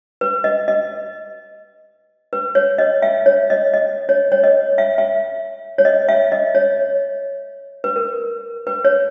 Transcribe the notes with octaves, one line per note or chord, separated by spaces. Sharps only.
B4
D#5
D#5
B4
C#5
D#5
E5
C#5
D#5
D#5
C#5
C#5
D#5
E5
E5
C#5
D#5
E5
D#5
C#5
B4
A#4
B4
C#5